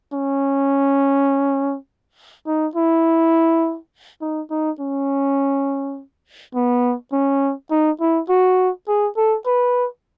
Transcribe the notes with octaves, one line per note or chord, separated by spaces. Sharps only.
C#4
D#4
E4
D#4
D#4
C#4
B3
C#4
D#4
E4
F#4
G#4
A4
B4